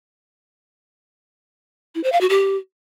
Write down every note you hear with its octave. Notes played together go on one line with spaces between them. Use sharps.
E4
C5
F5
F#4
G4